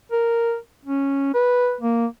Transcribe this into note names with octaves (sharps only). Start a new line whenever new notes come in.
A#4
C#4
B4
A#3